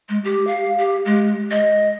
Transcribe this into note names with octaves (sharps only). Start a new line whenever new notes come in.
G#3
G4
F5
G4
G#3
D#5